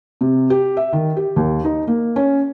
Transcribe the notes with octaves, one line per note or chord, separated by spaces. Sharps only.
C3
G4
E5
D#3
G4
D#2
D#4
A#3
C#4